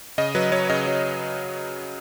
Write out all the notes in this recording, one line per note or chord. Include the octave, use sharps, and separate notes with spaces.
C#3 D#5
F#3 B4
F#3 C#5
C#3 D#5
F#3